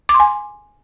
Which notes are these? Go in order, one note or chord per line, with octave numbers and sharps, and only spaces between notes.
D6
C6
G#5